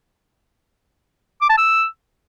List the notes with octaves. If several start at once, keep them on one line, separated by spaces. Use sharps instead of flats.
D6
A5
E6